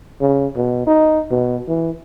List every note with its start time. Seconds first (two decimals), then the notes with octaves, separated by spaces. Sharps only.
0.21 C#3
0.56 B2
0.87 D#4
1.31 B2
1.68 E3